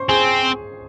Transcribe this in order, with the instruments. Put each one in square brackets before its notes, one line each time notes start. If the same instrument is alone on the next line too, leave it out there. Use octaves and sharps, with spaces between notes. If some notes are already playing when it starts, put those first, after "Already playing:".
Already playing: [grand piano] C5 C6 C#6
[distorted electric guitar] C4 [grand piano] G#4 G#5